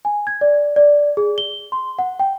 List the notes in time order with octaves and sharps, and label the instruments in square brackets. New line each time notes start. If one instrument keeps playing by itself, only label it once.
[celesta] G#5
G#6
D5
D5
G#4
G7
C6
F#5
G5